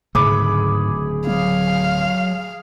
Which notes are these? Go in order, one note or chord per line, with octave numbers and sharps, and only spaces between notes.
D1 G#2 C#3 A3 G#4 B5 D6
F#3 F5